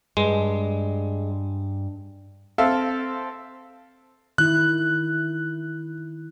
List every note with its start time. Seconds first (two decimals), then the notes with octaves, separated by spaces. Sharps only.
0.17 G2 G#3
2.58 C4 A4 E5 F5
4.38 D#3 E4 F#6